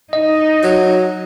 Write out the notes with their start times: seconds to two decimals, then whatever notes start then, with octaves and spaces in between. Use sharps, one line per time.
0.13 D#4 D#5
0.63 F#3